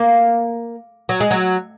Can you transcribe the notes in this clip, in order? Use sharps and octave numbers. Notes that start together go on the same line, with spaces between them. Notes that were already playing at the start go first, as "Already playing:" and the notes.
Already playing: A#3
F#3
G#3
F#3